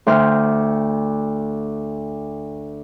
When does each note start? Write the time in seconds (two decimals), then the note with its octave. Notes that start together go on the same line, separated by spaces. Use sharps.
0.07 D2 C5 G5 F6